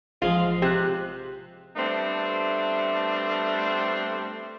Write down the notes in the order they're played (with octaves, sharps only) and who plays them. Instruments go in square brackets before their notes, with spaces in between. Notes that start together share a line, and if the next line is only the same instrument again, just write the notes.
[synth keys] A1 G#4 [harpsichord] G#2 F3 G#3 [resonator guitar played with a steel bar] F4
[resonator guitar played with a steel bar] C3 [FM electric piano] G4 [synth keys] C5 F#6
[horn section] G3 A3 B3 C4 D4